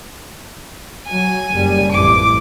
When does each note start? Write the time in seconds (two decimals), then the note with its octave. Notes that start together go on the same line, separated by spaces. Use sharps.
1.08 F#3 G#5
1.51 F#1 G3
1.91 A1 F2 E3 D6